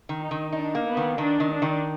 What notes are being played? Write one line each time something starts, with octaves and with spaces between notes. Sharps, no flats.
D#3
D#4
D#3
D4 D#4
A#3
B3
D#3
D#3 D4
D#3
D4
D#3